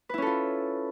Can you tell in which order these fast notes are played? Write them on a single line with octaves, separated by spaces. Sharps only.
B4 E4 C#4 A4 F4